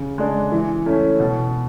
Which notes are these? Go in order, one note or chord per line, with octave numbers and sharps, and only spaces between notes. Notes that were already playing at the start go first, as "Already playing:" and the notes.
Already playing: C#3
G#3 D4
E3
A3 C#4 E4
B2